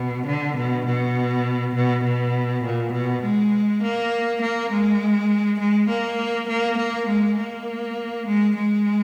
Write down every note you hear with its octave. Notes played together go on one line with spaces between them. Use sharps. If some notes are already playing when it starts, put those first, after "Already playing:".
Already playing: B2
D3
B2
B2
B2
B2
A#2
B2
G#3
A#3
A#3
G#3
G#3
A#3
A#3
A#3
G#3
A#3
G#3
G#3